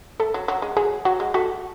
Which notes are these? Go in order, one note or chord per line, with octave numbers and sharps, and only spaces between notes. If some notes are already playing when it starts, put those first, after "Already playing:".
A3 A4
F#3
F#3
G#3
F#3 G#4
F#3 F#4
G#3
A3 F#4